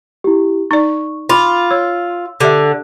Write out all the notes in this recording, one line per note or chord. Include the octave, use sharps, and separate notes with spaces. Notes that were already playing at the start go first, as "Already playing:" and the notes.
E4 G4
D#4 D5 C#6
F4 B5 D6
C#5 E6
D3 G4 E5